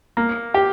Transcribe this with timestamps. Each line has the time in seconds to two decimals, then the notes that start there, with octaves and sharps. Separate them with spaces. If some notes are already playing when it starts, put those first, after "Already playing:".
0.17 A#3
0.54 G4